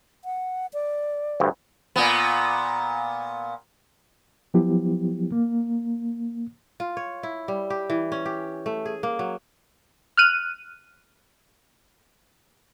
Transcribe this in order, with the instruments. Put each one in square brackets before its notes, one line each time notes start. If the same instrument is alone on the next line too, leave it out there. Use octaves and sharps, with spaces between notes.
[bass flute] F#5
D5
[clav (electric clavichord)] D2 G2
[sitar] A#2 B3
[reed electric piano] F3 F#3 B3 E4 G4
A#3
[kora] F4
C#5
E4
G3
G4
E3
C#4
G4
A3
G#4
A#3
F#3
[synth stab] F6 F#6 D#7